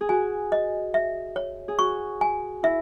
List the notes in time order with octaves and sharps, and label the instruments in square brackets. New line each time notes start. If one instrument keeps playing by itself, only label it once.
[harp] G#4
[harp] F#4 [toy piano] G#5
[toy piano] D#5
E5
C#5
[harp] G#4
[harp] F#4 [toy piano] C#6
[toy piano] G#5
[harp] E4 [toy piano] E5